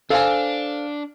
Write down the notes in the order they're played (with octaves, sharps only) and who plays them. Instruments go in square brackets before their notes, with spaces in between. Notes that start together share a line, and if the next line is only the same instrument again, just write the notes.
[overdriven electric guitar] D4 [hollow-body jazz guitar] A4 C5 G#5 [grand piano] F5